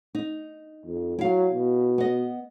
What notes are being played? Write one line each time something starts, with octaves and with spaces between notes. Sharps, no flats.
D#4
F2
F#3 E4 F5
B2
B3 D#5